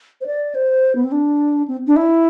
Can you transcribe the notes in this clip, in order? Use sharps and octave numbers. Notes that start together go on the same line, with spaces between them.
C5
D5
C5
B3
C4
D4
C4
D4
E4